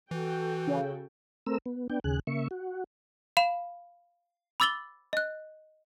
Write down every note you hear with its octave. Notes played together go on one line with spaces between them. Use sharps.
E3 F#4 A4 G5
C#3
A3 C4 A#4 E6
B3
B3 D4 G5
D#2 C#3 G#4 F#6
C#3 A#3 E5 C#6
F#4
F5 B5 E7
B5 D6 E6 A6 F#7 G7
D#5 F#6